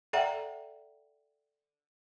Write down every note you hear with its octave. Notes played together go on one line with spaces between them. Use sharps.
A4 D5 E5 F#5 G5 A#5